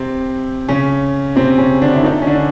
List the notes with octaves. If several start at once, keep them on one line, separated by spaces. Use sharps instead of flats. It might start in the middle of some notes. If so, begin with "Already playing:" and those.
Already playing: C3 C4
C#3 C#4
C3 C4
C#3 C#4
D3 D4
E4
D#3 D#4
C#4
D3 D4